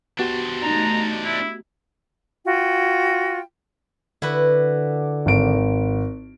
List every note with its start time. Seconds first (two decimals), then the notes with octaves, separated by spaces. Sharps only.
0.19 B3 D4 F#4 G4 C5
0.63 A3 D#4 A#5
1.25 E4
2.45 F4 F#4 G5
4.22 D3 E4 F#4 B4
5.26 G#1 D7